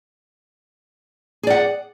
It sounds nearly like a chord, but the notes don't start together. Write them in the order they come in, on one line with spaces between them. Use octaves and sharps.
G#4 D5 F#5